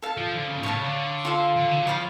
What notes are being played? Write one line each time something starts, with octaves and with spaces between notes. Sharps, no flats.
A4 F5 A5
F3
D3
C#3
G#2
A2 C#5 F5 A5
C#3
D3
F4 A4 F5
D3
C#3
D3
F#3
F3 C#5 F5 B5 D6